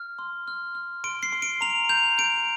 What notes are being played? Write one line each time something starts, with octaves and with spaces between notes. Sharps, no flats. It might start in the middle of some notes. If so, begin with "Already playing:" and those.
Already playing: F6
C6
F6
F6
C6 D7
C7
C6
D7
A#5 F7
G6 F7
G6 D7